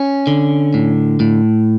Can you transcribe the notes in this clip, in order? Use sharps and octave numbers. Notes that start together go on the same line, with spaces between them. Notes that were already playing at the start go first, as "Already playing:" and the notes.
Already playing: C#4
D3
A2
A2